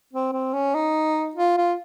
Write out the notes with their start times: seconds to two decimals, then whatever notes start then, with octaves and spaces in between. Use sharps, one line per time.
0.13 C4
0.33 C4
0.54 C#4
0.75 D#4
1.36 F4
1.57 F4